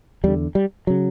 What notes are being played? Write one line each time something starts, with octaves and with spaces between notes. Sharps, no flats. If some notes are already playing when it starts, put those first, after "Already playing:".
E2 D3 G3
G3
C#3 F#3